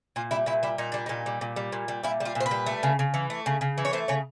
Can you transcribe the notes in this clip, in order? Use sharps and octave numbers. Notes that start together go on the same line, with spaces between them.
A#2 F4
G3 E4
A#2 E4
G3 E4
A#2 D#4
G3 D4
A#2 D#4
G3
A#2
G3
A#2
G3
A#2 E4
G3
F4
A#2
C5
B4
G3
A3
C#3
C#3
E3
A3
C#3
C#3
E3
C#5
A3 C5
C#3 C#5